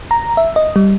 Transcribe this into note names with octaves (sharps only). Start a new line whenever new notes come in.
A#5
E5
D#5
G3